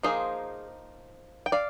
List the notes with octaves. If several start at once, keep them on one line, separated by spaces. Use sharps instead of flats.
F3 A#3 D#4 G#4 C5
G5
D5 F5